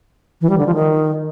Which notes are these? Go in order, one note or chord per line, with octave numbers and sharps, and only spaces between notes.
E3
G3
D3
F3
D#3